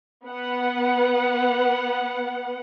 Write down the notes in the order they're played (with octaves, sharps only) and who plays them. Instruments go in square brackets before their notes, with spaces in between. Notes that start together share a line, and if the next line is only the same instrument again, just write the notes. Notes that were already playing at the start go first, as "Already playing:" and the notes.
[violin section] B3 F#5